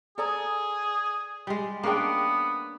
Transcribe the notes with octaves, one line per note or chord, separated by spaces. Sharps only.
G#4 A4 D5 A#5
G3 G#3
A#3 B3 C#4 D4 G#4 G5